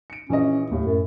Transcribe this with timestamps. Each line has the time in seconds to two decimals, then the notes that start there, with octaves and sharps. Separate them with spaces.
0.10 C#7 D7
0.30 A#1 E3 C#4 D#5
0.72 D#2 A2
0.85 F#2